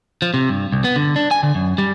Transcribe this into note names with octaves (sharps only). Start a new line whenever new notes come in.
F3
C3
G2
C2
B3
D3
D4
G#5
D3
F#2
G3